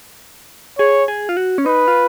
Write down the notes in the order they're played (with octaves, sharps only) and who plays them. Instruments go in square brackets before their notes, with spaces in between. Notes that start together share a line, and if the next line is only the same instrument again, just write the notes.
[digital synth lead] G#4 [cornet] C#5
[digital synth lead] G#4
F4
F#4
C#4
[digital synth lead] D#4 [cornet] B4
[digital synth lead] F4